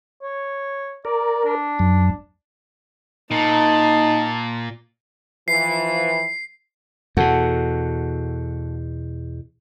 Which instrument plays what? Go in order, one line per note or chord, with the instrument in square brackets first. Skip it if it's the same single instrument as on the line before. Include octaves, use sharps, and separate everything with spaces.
[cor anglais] C#5
[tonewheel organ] A#4 [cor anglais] D5
[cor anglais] D4
[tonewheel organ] F#2
[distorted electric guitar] A#2 [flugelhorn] D#4 [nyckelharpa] A5
[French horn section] E3 F3 [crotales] C7
[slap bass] E2 B2 [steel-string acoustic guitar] F#4 A4